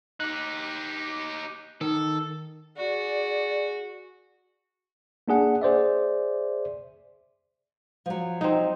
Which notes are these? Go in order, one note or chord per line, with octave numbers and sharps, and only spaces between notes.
D#4 G4 F#6
D#3 A4
F#4 G#4 D5
A#3 D4 G#4 F#5
G#4 C5 D5 E5
F3 F#3
C4 D#4